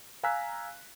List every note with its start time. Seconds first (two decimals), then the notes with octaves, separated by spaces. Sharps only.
0.23 F5 G#5 A#5 E6 F#6 B6